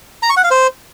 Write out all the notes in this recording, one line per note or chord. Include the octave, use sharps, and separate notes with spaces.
A#5
C#6
F#5
F5
C5